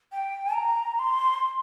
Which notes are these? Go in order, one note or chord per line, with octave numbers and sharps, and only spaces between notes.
G5
A#5
C6